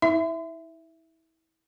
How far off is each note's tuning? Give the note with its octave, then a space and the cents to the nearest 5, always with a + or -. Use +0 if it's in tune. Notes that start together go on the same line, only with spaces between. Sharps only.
E4 -30 E5 +5